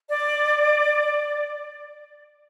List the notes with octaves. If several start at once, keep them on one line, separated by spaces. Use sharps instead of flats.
D5